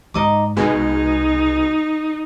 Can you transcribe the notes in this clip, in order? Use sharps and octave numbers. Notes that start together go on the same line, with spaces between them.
G#2 D#4 D#5 D6
C2 B2 G#3 D#4 G#5